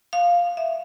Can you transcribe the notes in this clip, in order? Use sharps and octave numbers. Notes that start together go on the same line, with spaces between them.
F5
E5